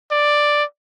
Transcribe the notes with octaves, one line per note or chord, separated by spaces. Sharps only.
D5